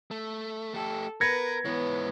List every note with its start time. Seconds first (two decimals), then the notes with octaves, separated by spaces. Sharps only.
0.11 A3
0.74 A3 G4 A4
1.21 B3 A#4 B4 G#6 A#6 C#7
1.65 G#2 E3 B3 C#5